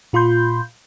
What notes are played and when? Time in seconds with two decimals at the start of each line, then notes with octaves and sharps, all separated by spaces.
0.13 A#2 F4 B5 C6 G6